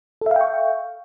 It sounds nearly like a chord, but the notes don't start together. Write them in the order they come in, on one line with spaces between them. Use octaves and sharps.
A4 E5 F5 G5 C#6